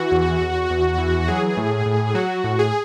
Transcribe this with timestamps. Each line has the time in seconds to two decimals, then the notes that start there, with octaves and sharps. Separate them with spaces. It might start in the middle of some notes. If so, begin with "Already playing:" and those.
Already playing: E3 F#4
0.11 E2
0.41 E2
0.70 E2
0.98 E3
1.28 F#3 G#4
1.57 A2
1.86 A2
2.15 F#3 F#4
2.44 A2
2.59 G#4